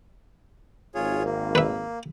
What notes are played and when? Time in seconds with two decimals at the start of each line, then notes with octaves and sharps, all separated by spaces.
0.95 G#1 F4 G#4 C#5
1.25 A#3
1.55 B4 E5